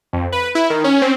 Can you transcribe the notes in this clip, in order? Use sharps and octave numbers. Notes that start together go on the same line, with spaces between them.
F2
B4
E4
D#3
C#4
C4